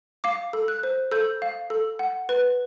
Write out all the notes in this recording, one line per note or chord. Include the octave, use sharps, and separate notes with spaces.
F5 D6
A4
F#6
C5
A4 G6
F5
A4
F#5
B4